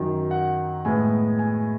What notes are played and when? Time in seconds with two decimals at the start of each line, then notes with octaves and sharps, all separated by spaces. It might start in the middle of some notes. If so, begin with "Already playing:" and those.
Already playing: F#2 D#3 F#3
0.31 F#5
0.85 A2 G#3 B3 G#5
1.39 G#5